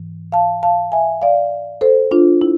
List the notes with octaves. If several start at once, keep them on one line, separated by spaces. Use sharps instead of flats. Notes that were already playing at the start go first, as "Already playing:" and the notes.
Already playing: G#2 E3
F5 A5
F5 A5
E5 G#5
D5 F5
A4 C5
D4 F4
E4